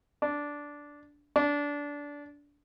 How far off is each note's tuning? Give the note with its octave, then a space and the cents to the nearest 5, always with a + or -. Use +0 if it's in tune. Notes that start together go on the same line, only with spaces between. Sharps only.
D4 -10
D4 -20